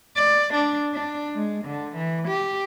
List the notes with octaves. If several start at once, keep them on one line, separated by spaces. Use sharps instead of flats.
D5
D4
D4
G#3
D3
E3
G4